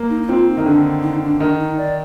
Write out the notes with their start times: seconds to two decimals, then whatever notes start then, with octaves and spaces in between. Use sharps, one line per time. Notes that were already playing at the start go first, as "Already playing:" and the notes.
Already playing: A#3
0.10 D#4
0.22 D#4
0.29 C4 F4
0.48 D#4
0.57 D#3
0.65 D3 D4
1.03 D#4
1.22 D4
1.40 D#3 D4
1.59 D#4
1.78 D5